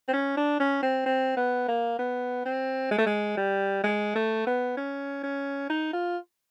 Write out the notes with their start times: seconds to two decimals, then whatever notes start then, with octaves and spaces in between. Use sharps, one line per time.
0.08 C4
0.13 C#4
0.37 D4
0.60 C#4
0.82 C4
1.06 C4
1.37 B3
1.68 A#3
1.99 B3
2.46 C4
2.91 G#3
2.98 A3
3.06 G#3
3.37 G3
3.84 G#3
4.15 A3
4.47 B3
4.77 C#4
5.23 C#4
5.70 D#4
5.93 F4